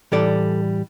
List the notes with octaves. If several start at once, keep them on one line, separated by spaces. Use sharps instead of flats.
A2 E3 G3 A4 D5